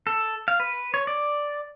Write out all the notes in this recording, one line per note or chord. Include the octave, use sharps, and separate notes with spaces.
A4
F5
B4
C#5
D5